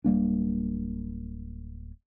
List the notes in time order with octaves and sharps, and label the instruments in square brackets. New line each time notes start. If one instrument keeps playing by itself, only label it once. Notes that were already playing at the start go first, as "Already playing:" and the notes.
[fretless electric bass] D1 G3 A#3 D4